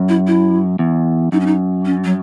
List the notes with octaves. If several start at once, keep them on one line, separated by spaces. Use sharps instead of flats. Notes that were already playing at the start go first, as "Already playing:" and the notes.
Already playing: F#2
E4
E4
E2
F#2 D#4
C#4
D#4
C#4
F#3